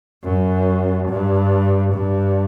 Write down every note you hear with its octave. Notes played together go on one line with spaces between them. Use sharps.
F#2
G2
G2